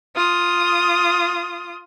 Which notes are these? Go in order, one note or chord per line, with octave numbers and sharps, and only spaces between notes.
F4 D#6